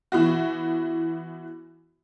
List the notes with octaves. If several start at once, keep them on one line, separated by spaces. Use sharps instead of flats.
E3 B3 F#4